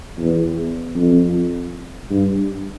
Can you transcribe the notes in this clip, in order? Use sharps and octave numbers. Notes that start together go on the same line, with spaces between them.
E2
F2
G2